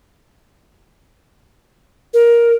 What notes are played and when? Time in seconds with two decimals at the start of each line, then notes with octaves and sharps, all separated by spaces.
2.13 A#4